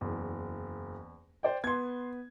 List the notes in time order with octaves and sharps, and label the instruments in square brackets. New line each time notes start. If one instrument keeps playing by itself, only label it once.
[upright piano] F#1 [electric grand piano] E2
[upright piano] C5 D5 G5
[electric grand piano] B3 B4 [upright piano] C6 G#6